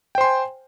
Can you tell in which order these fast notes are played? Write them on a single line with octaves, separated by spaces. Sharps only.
G5 C5 C6 G#5